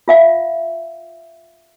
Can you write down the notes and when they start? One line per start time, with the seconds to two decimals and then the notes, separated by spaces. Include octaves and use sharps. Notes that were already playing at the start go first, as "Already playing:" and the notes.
0.08 F4 E5 F5